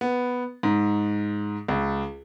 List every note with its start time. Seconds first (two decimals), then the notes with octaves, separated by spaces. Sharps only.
0.01 B3
0.63 G#2
1.68 C#2